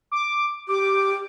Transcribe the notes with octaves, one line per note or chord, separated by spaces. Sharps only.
D6
G4 D6